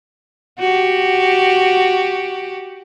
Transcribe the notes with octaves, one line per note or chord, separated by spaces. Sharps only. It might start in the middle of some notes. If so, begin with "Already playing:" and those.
F#4 G4